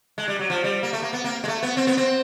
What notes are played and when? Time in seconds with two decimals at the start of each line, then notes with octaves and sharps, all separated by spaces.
0.18 G#3
0.28 G3
0.39 F#3
0.50 F3
0.64 G3
0.83 A#3
0.93 A3
1.02 A#3
1.13 B3
1.24 A#3
1.44 G#3
1.48 A3
1.63 B3
1.77 C4
1.87 B3
1.97 C4